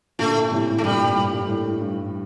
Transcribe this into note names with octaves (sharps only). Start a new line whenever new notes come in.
A#2 D3 A3
A2 C3
A3
G2 A#2 G3
G2
A2
G2